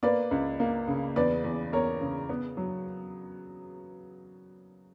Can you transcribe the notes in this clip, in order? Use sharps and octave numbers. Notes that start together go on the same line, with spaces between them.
A#3 B4 D5
C#2
A#3
C#3
E2 B4 D5
E2
E2 A#4 C#5
C#3
B3
F#3